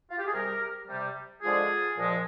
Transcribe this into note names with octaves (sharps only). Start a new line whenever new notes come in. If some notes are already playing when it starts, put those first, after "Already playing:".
F4
G4
G#4
C3 G3 G4 A#4
C3 G3
D3 F3 G#3 F4 G#4
A#2 F3 G#3